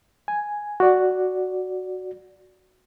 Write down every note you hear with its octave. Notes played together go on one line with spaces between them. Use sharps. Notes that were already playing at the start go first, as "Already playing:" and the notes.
G#5
F#4 D5